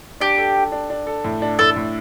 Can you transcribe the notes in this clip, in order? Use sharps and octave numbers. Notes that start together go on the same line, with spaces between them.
D4 G4
A4
A4
D4
D4
A4
A2
D4
A2 A4
A2